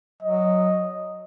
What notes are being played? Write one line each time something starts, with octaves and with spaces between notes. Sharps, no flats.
F#3 D#5